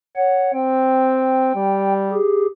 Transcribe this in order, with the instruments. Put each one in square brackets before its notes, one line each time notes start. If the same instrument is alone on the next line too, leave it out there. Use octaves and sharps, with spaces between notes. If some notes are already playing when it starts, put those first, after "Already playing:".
[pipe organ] C#5 F#5
[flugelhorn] C4 [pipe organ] G5
[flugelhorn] G3
[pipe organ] G4 G#4